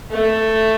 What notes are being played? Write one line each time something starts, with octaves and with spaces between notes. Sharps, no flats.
A3